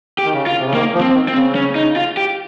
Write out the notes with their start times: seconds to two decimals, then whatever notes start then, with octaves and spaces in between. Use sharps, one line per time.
0.19 G4
0.24 D#3
0.33 C#3
0.47 F4
0.59 C3
0.67 C#3
0.74 D#3 A#3
0.94 F3
1.01 C4
1.15 D#3
1.28 C4
1.35 C#3
1.55 C#4
1.75 D#4
1.96 F4
2.17 G4